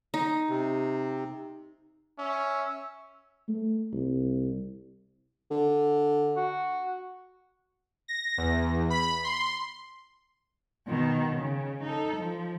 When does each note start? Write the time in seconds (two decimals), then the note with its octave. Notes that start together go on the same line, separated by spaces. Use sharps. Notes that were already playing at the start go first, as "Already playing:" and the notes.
0.14 D#4
0.49 C3
2.19 C#4 E5
3.48 A3
3.93 C2
5.51 D3
6.36 F#4
8.08 A#6
8.38 E2
8.90 B5
9.24 C6
10.87 B2 D#3
11.35 C#3
11.83 D#4 A4
12.16 F3